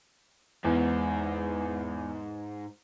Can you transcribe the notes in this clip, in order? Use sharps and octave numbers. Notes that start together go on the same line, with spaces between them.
E2 G#2